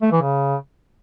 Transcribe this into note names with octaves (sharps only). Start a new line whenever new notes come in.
A3
E3
C#3